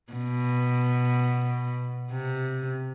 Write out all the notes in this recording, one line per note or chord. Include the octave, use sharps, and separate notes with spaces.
B2
C3